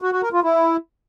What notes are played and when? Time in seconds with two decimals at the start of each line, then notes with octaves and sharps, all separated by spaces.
0.02 F#4
0.12 F#4
0.22 A#4
0.33 F4
0.43 E4